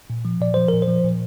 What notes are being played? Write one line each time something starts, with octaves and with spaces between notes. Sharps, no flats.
A#2
F3
A#2 D5
F3 C5
A#2 A#4
C5
F3
A#2